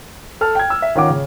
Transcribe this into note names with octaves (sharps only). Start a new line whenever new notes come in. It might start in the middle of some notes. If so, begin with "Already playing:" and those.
A4 A5 F6
G5 G#6
E6
E5
D#3 C#4 F4 C#5 F#5 D6
C#3